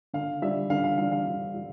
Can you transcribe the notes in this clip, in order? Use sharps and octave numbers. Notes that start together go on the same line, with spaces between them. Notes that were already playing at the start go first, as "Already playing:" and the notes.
D3 F5
G3 D4 E5
D3 F5
F5
G3 D4 F5
F5
D3
G3